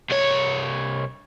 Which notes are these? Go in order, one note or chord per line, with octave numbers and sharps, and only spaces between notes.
C2 C#5